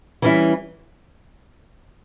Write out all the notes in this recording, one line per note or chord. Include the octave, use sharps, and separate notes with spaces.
E3 G3 C#4 E4